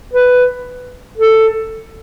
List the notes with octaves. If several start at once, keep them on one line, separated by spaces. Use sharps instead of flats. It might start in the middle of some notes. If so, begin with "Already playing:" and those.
B4
A4